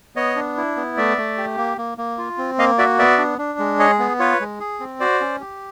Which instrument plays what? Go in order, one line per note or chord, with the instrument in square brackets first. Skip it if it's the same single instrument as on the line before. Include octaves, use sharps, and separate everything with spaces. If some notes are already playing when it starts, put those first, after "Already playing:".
[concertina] B3 C#5 D#5
D4
E4
B3
A3 D5 E5
A3
G4
A#3
A#3
A#3
F4
C4
A#3 D#5 F5
F#4 D5 E5
B3 D5 E5
D4
D4
G#3
G#4 C#5 D#5
B3
F4 B4 C#5
G#3
G#4
C4
F#4 C5 D5
C#4
G4